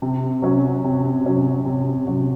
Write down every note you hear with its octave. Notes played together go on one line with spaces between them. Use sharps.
C3
F#3 C#4 F#4
C3
F#3 C#4 F#4
C3
F#3 C#4 F#4